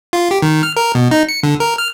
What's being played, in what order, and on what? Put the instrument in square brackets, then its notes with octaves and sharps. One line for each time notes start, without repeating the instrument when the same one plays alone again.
[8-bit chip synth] F4
G4
D#3
F6
A#4
B2
D#4
C#7
D3
A#4
F6